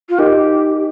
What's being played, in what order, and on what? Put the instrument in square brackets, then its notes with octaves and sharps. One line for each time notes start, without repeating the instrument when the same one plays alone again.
[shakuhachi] F4
[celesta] D#4 A#4 D#5 [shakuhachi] G4